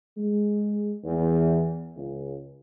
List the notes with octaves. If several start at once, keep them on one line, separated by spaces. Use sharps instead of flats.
G#3
E2
C#2